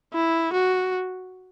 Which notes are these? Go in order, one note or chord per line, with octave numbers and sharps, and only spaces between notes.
E4
F#4